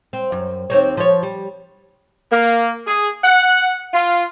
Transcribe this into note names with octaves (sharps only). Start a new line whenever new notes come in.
C4
F#2
D#2 C4 C#5
F3 C#5
G3
A#3
G#4
F#5
F4